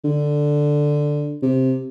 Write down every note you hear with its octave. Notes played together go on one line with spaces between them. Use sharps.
D3
C3